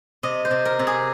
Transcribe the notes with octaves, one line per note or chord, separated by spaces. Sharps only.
C3 D#5
C5
C3
A#4
C3
G#4